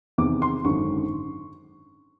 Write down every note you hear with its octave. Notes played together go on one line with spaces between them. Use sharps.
E2 C3 D#3 D6
C6
G#1 F#2 D3 C#6